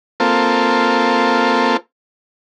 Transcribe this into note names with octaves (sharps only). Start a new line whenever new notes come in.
A#3 C4 F4 A4